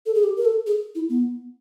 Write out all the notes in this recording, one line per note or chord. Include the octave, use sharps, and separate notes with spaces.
A4
G#4
G4
A#4
A4
G#4
E4
B3